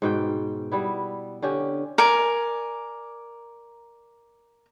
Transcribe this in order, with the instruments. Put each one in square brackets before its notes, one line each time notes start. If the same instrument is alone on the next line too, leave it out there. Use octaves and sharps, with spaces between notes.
[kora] G#2 B2 G5
G3 B3 E4
D3 C#4 G4
[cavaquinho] A#4 D5 G#5